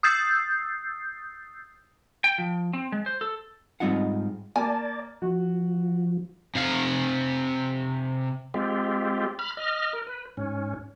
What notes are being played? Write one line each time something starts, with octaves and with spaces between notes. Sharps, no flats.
D#6 E6 G6 A6 C7
G5
F3
C4
G#3
C5
A4
G#2 G3 C4 D#4 F4 F#5
A#3 D5 G#5 A5
F3 F#4
C3 F5
G#3 C4 F4 G4
B5 F6
D#5 F6
A#4
B4
G#2 C#4